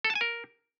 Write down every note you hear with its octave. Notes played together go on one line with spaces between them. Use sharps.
A4
A5
G#5
A#4